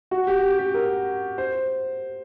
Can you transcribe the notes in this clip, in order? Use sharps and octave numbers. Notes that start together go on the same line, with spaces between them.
F#4
G4
G4
G4
A#4
C5